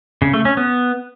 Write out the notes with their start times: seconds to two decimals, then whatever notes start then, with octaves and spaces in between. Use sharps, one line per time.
0.22 C#3
0.34 A3
0.45 C#4
0.57 B3